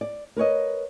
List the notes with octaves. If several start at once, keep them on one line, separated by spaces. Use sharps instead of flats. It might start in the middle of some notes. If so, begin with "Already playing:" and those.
D5
A#4 B4 C#5 D#5